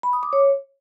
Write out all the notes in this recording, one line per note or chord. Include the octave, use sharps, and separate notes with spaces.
B5
D#6
D6
C#5